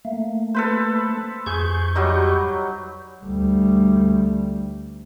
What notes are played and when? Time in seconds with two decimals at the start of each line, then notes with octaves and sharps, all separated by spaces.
0.05 A3 A#3
0.54 A4 B4 C5
1.46 F2 G#4 C#6 G6
1.95 F#3 G3 D#4
3.23 D2 G3